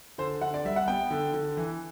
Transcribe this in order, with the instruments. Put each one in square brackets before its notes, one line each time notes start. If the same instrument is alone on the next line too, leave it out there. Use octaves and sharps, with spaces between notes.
[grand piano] D3 C5
D3 F#5
D5
G3 E5
F#5
B3 G5
D3
D3
E3